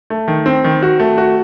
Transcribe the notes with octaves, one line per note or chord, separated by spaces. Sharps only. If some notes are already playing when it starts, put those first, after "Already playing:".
A3
D#3
C4
D#3
F#4
A3
F#4